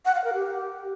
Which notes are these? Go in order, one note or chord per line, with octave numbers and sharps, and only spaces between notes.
F#5
F5
A#4
G4